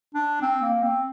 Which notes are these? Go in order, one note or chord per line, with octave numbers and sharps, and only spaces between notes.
D4
C4
A#3
C4